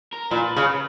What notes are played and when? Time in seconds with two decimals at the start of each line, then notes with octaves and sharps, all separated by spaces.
0.13 A#4
0.31 A#2 B4
0.56 C#3